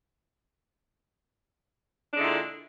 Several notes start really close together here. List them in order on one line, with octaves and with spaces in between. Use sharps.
D4 G#3 D3 E4 A#2